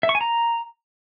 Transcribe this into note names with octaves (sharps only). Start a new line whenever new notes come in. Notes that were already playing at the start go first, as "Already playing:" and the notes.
E5
C#6
G#5
A#5